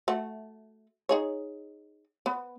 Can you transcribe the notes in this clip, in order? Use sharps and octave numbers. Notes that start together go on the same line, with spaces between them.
A3 F#4
D#4 G#4 C#5
B3